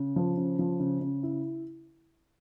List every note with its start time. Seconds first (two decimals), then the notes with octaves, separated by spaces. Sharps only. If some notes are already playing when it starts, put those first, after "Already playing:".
Already playing: C#3
0.16 F3
0.37 C#3
0.59 F3
0.80 C#3
1.01 C#3
1.23 E4